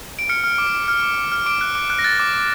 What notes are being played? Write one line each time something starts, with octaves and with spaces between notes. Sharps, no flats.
D7
F6 C#7
F6
D6
D6
F6
D6
D6
F6
D6 D7
F#6
D6
F#6
A#6
F#6 A6
D6
D6